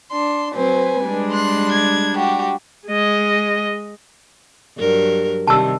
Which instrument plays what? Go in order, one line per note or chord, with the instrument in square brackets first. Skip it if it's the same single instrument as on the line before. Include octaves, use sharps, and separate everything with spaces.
[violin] D4 C6
[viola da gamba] F#3 C4 C5 [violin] B4 G#5
[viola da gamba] G3 G#3 D4
[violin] C6 F#6
G#6
F#4 G4
[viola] G#3 D#5
[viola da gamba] G2 F#3 A#4
[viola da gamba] C3 D#3 G3 [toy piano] A5 E6